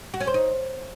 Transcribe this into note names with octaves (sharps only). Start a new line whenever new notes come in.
F#4
C#4
C5
D#4